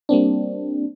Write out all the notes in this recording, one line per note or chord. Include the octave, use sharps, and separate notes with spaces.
G3 A#3 C4 D4